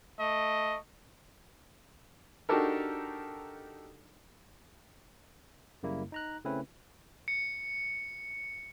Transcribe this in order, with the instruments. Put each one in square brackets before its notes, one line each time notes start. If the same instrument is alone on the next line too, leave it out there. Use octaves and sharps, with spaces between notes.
[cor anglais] A3 [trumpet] D#5
[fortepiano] D4 D#4 F#4 G4 A4 A#4
[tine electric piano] F#2 C#3 G3 A#3 E4
D#4 A#5 F#6
C#3 A3 C4 C#4 E4 B4
[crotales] C#7